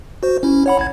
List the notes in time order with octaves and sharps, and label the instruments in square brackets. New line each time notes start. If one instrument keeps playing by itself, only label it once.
[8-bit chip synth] F#4 C5
C#4 E4
C#5 F#5 B5
A1 G#6